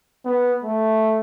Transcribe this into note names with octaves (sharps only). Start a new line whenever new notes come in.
B3
A3